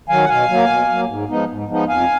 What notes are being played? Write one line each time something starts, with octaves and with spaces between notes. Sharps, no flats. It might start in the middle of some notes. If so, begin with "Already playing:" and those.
D#3 F#3 F5 G#5
F#5
B2 F5 G#5
F#3 A#3
B2
F#3 A#3
G#2
F3 G#3 B3 D#4
G#2
F3 G#3 B3 D#4
F2 F5 G#5